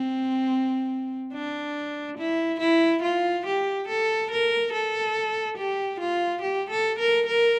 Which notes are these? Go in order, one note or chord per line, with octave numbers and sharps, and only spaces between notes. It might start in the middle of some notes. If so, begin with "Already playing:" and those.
Already playing: C4
D4
E4
E4
F4
G4
A4
A#4
A4
G4
F4
G4
A4
A#4
A#4